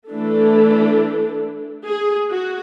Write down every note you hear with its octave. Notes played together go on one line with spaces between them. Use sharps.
E3 A3 D4 A4
G#4
F#4